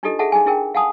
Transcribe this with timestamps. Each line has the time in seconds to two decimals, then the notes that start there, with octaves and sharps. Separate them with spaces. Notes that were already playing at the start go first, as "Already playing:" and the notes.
0.03 D4 D#4 F4 G4 A4 D#5
0.19 G#4 A4 E5 F#5 A5
0.32 D#4 G#4 G#5
0.46 D4 E4 G#4 A#4 G5
0.74 F5 F#5 G#5 A5 D#6